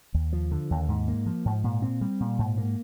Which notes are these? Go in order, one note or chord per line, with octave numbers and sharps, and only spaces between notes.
D#2
F3
D3
D#2
G#2
A#3
F3
G#2
A#2
C4
G3
A#2
G#2
A#3